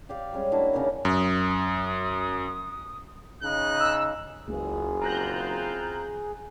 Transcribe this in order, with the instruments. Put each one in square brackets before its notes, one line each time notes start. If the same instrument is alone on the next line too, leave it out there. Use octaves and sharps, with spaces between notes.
[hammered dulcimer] G4 D5 F5
G3 G#3 C#4
A#3 D4 E4 F#4
C#3 C#4 D#4 A#4
[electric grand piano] F#2 [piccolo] D#6
[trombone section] C#3 D#4 [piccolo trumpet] F#6
[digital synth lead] E6
[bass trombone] F#1 [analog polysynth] C#2 [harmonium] G#4
[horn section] C4 E4 F4 [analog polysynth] A#5 F#6 G6